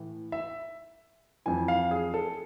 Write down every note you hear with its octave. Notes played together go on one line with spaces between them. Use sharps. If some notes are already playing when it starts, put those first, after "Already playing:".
Already playing: A2 E3
E5
F2 E3 G#5
F5
G#4
A4